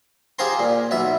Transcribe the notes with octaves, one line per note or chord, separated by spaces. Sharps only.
F4 G4 G#4 C5 A#5 C6
A#2
B1 B2 E5